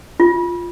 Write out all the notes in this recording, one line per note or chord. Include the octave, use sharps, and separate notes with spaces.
F4